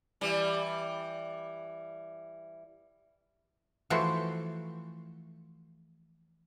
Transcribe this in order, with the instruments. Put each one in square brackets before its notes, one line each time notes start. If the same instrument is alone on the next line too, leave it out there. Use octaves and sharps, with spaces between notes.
[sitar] E3 G3
[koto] E3 F3 A3 F#4 C5